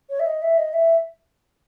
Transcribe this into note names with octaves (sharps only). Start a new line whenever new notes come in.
C#5
E5
D#5
E5
D#5
E5